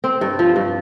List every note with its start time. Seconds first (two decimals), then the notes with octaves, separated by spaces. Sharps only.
0.04 C4
0.21 G2
0.39 F3
0.56 G2